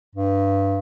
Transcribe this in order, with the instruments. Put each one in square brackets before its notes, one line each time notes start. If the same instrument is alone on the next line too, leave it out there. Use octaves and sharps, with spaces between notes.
[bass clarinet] G2